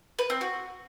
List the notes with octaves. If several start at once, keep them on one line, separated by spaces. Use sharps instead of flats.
B4
C4
F#4